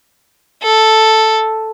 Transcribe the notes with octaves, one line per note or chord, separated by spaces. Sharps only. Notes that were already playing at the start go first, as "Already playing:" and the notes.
A4